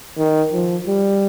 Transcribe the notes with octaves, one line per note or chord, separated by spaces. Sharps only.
D#3
F3
G3